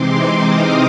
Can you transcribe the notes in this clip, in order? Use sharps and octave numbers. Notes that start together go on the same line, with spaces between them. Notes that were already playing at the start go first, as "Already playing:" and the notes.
Already playing: C3 E3 G#3 C4 D#4 C6 D6
D#6 F6